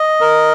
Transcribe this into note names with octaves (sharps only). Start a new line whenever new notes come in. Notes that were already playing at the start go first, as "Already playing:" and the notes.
Already playing: D#5
A#4